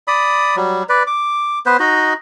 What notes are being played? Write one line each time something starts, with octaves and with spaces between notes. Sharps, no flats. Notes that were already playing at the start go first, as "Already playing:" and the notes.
D5 B5 D#6
F#3 G3
B4 D5
D6
B3 B4 C5
D#4 F#4 D#5